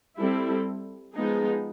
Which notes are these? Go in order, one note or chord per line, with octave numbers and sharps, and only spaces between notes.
G3 C4 E4 A4
F3 G#3 B3 D#4 G#4